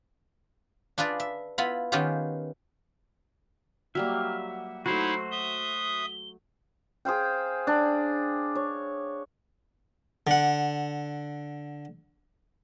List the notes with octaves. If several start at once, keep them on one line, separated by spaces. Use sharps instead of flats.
D4 F4 G#4 B4 D5
E5
B3 E4 F4 B5
D#3 B3 C#4 F4 G4 G#4
F#3 G3 A#3 E5 F6
F#5
F#3 A3 D#4 E4 F#4 C5 C7
E5 D#6 G7
G#4 C5 F5 G5
D4
C#5
D3 F#5